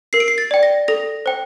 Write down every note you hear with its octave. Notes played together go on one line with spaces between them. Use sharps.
A#4 C7
D7
C7
A6
D5 G5
A#6
A4 A#6
C5 G5